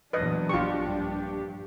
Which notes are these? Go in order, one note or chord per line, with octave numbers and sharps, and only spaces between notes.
E2 A#2 F#3 D4 B4 D#5
A#1 F4 G4 C#6
G2